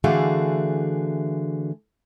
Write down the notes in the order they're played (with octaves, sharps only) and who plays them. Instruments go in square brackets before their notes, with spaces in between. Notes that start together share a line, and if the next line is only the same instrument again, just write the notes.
[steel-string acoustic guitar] D3 E3 A3 F#4 G#4 F5